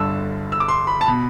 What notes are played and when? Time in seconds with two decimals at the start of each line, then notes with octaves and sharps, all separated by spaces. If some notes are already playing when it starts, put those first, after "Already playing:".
Already playing: G1 G2 D3 A5 E6
0.52 E6
0.60 D6
0.68 C6
0.87 B5
1.01 A5
1.06 B2 B5